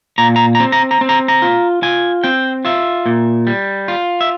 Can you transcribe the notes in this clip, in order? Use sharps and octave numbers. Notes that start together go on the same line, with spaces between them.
A#2 A#5
A#5
A#5
C4
A#5
A#5
C4
A#5
A#5
F4
F4 G#5
C4 G5
F4 E5
A#2
G3
F4
E5